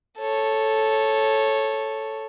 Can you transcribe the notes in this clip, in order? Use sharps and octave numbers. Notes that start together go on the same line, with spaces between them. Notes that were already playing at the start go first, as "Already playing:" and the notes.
A4 C#5